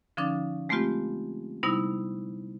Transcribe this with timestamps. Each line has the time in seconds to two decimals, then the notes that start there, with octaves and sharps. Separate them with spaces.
0.17 D3 F3 C#4 D#4 D6 A6
0.69 G#3 A3 B3 C4 F4 G4
1.63 C3 G3 B3 D#4 E4